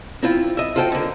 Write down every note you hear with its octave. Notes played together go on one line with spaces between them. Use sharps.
C4 E4 F4
D#5 E5
F4 F#4 A4 C5 G5
D3 A#3